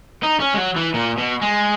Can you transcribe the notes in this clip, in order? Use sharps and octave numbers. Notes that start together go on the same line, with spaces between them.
D#4
C#4
G#3
F#3
E3
A#2
B2
G#3